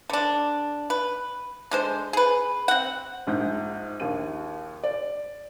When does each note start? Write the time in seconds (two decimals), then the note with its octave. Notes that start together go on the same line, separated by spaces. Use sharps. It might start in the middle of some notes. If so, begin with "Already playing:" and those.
0.10 D3 D4
0.90 B4
1.71 D3 G#3 C5
2.13 G#4 B4
2.68 C4 F#5
3.27 A#1 G#2 G6
4.00 A#1 D#2 D#7
4.84 D5